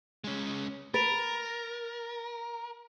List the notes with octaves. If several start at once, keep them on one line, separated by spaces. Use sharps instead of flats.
G#3 C#4
A#4 B4 A6 D7 F7